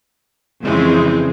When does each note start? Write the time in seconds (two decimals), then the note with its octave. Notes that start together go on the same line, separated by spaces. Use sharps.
0.64 F2 C#3 E3 G#3 C4